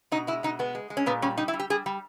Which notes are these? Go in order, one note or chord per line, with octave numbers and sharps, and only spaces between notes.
B2 D#4
G#3 E4
B2 D#4
G#3 B3
G#3
G#3
C#4
A#2 B3
G3 C#4
G3 D#4
E4
G3
G4
G3 G#4
G3